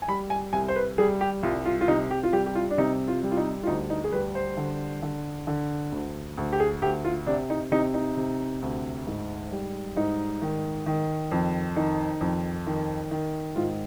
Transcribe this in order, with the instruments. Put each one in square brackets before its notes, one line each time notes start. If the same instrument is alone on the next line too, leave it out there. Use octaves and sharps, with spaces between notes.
[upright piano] G#5
G3 B5
G#5
C2 G#5
C5
B4
G3 G#4
G4
C2 F4
F4
F4
C3 D#4
G4
F4
G3 G4
G4
F4
D4
C3 D#4
F4
G3
F4
D#4
F4
D2 D#4
D#4
G#4
G3 B4
C5
D3
D3
D3
D2
D2
G4
G#4
D2 G4
F4
C3 D4
D#4
C3 D#4
D#4
C3
D2
G#2
G3
G#2 D#4
D#3
D#3
F2
D#3 D#4
F2
D#3
D#3
G#2 F4